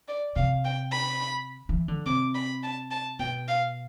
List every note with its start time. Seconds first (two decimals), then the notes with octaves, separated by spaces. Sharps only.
0.08 D5
0.36 C3 F5
0.65 G5
0.92 B5
1.69 E3
1.88 D3
2.06 C3 D6
2.35 B5
2.63 A5
2.91 A5
3.19 B2 G5
3.48 F5